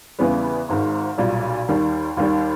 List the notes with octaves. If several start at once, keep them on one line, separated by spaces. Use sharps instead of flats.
E2 C#3 E3 G3 B3
G#1 G#2 D#3
B1 A#2 G3
D#2 D#3 G3
D#2 D#3 G3